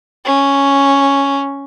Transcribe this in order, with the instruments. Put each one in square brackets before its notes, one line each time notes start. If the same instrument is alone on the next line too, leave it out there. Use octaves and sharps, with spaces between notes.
[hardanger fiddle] C#4